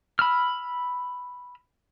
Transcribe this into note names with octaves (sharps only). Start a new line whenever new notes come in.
B5 E6 F6